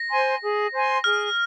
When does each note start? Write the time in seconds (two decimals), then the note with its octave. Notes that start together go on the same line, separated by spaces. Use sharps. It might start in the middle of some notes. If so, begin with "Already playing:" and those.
Already playing: A#6
0.11 C5 G#5 C6
0.42 G#4
0.73 C5 G#5 C6
1.04 G#4 F6